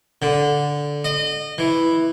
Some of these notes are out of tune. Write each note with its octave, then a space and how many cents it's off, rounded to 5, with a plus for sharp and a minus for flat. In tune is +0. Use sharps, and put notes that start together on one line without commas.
D3 -10
D#5 -30
E3 +0